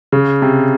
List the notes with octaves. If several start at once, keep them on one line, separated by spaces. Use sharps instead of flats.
C#3
C3